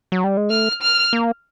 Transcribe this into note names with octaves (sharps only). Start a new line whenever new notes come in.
F#3
G3
G#3
A3 F6
F6
A#3